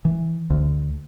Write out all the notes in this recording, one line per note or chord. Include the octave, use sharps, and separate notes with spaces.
E3
D2